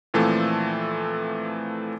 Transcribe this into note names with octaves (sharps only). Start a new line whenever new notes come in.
A#2 E3 F3 A3 C4 A4